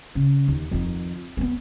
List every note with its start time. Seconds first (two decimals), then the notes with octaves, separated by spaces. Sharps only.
0.15 C#3
0.48 D#2
0.71 F2 D#3
1.37 A#3 B3